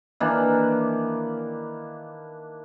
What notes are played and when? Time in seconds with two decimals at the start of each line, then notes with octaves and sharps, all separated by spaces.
0.20 D#3 E3 A#3 D4